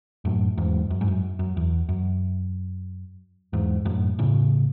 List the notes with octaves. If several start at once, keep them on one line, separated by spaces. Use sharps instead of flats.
F#2 A2
E2 G#2
F#2
G#2
F#2
F#2
E2
F#2
E2 G#2
F#2 A2
A2 C#3